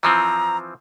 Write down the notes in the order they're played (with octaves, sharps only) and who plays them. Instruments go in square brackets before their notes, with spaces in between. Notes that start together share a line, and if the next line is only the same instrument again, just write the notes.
[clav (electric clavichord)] E3 F3 C4 [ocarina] A#5